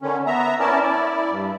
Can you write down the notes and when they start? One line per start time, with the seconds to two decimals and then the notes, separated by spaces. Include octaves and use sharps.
0.02 D3 D#3 C#4
0.27 B3 E5 A#5
0.60 C#4 E4 A#4 D5 A5
0.82 E4 D5
1.30 G2